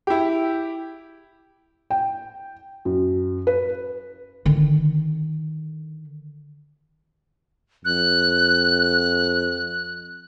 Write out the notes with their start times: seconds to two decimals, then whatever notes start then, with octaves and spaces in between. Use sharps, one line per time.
0.07 E4 G4
1.90 G5
2.85 F#2
3.47 B4
4.45 D3 D#3
7.85 F2 F#6